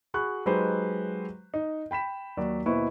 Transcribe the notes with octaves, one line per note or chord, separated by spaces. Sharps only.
F#4 G#4 B5 C#6 F#6
F#3 G#3 D#4 G4 B4 C5
D#4
G5 B5 B6 E7
D#2 F#3 D5
D#2 B2 E4 B4 C5 C#6